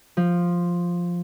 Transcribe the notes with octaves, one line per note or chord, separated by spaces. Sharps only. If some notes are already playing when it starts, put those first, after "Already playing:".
F3